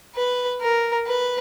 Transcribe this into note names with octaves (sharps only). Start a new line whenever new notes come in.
B4
A#4
B4